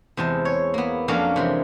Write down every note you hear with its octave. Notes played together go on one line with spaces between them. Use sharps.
E2 C3 G#3 A5
C#5
A#3 B3
F2 F#3 A#3 C#4 D4 F5
C3 E3 G#3